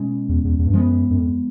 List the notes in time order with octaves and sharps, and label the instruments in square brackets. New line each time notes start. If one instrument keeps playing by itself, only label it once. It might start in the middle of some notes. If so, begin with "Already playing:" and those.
Already playing: [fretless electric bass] B2 G#3 C#4
[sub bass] E2
E2
E2
G2
[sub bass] F#2 [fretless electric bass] F3 G#3 B3
[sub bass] F#2
F2